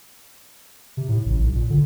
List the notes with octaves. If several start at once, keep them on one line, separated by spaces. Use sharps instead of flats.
C3
A2
A1
B1
A#2
D3